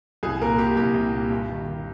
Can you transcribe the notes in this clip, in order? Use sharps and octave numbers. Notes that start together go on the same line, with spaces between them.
C2 G#4
A#2 A#4
A#2 G4
C2 G4
C2
A#2
G2
D#3
D#3